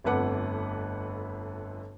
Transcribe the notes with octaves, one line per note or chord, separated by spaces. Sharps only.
G1 F2 A3 B4 F#5 D6